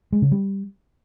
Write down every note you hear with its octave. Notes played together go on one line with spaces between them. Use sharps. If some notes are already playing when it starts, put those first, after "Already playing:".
G#3
C#3
G3